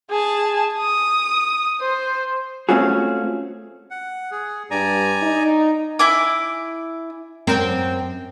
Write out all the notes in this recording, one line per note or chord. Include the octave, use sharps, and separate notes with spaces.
G#4 A5
D#6
C5
A3 C4 C#4 F4 F#4 G#4
F#5
G#4
G2 D5 G#5 A#5
D#4
E4 G#5 D6
F#2 C4 A#4